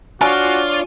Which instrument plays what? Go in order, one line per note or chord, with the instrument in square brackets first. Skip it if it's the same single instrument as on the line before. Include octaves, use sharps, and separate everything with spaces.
[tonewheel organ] D4 C#5 D5 [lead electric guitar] F4 F5 [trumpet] F#4 [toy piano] G#5